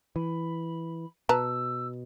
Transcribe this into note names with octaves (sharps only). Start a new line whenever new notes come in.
E3 B5
B2 B4 A5 A#5 E6